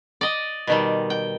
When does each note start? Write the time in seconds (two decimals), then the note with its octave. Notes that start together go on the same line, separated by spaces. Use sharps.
0.21 D5 D#5
0.67 B2 D#3 G3
1.10 G5